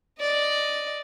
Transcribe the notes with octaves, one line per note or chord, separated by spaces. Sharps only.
D5 D#5